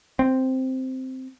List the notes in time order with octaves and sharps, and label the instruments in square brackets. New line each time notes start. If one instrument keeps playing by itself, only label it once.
[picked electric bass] C4